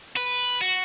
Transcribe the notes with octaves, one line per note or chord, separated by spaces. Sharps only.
B4
F#4